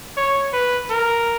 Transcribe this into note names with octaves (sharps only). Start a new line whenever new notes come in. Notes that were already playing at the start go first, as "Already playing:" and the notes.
C#5
B4
A#4